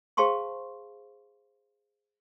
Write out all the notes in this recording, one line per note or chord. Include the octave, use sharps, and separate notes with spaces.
G#4 C5 F5 A5 C6 C#6